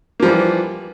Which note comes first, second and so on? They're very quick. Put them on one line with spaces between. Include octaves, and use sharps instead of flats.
A#3 F3 G3 E3